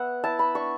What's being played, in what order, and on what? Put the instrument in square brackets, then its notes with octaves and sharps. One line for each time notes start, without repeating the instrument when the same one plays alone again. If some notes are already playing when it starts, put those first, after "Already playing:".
Already playing: [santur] B3 E5 F#5
E4 A5
B5
D4 C#6